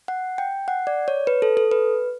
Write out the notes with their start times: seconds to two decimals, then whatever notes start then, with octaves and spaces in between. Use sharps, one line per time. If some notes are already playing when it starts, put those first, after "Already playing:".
0.08 F#5
0.38 G5
0.68 F#5
0.87 D5
1.08 C#5
1.27 B4
1.42 A4
1.57 A4
1.71 B4